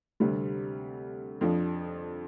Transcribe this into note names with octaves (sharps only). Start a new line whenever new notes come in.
D2 C3 G3 C4
F2 F3 D4